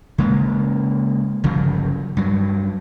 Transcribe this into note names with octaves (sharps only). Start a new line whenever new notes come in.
C#3 G#3 A#3
G1 C#3 F3 F#3
G2 F#3